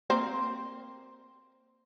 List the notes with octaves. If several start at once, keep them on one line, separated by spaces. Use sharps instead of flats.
A#3 C4 C5